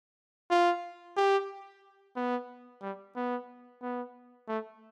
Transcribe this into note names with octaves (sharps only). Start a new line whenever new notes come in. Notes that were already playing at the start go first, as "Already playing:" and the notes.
F4
G4
B3
G3
B3
B3
A3